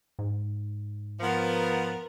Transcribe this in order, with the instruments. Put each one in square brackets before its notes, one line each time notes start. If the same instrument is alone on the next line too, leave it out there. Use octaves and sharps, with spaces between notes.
[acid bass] G#2
[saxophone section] F3 B3 [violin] A#4